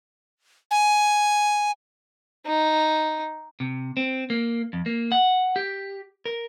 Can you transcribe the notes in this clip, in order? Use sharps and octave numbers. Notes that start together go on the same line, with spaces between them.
G#5
D#4
C3
C4
A#3
F2
A#3
F#5
G4
A#4